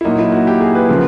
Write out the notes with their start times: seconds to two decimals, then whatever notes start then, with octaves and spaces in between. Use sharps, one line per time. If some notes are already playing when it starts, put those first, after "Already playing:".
0.01 E4
0.04 A#2 F#3 A#3 D#4
0.19 E4
0.32 F#4
0.47 G4
0.60 G#4
0.75 B4
0.89 C#3 F3 A#3